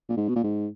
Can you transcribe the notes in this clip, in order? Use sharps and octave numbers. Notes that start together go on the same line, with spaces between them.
A#2
G#2
B2
A#2
G#2